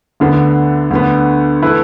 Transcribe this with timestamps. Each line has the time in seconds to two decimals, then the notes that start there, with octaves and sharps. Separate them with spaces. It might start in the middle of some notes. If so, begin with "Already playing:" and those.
0.20 D2 D3 B3
0.91 D2 D3 B3
1.63 E3 A3 E4 B4